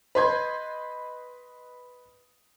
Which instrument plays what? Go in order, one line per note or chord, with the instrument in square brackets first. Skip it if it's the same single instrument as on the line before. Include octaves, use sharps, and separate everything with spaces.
[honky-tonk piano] B4 D#5 C6 G6 G#6